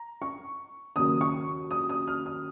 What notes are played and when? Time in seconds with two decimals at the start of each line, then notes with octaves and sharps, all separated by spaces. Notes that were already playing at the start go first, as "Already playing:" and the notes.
Already playing: A#5
0.22 C#6
0.96 D#2 C#3 F#3 A#3 D#6
1.21 C#6
1.71 D#6
1.89 D#6
2.07 F6
2.26 D#6